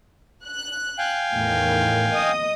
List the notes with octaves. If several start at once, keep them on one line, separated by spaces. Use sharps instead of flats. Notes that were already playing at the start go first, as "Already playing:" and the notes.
F#6
F5 G5 G#5
E2 A2 D#3
D#5 D#6